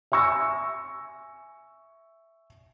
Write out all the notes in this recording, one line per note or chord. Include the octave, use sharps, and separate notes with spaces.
E5 G#5 C#6 E6 A#6